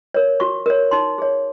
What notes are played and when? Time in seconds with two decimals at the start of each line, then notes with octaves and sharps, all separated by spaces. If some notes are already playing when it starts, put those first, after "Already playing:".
0.14 A#4 C#5
0.40 F#4 C#6
0.66 A#4 C#5
0.91 D#4 C6
1.18 G#4 C#5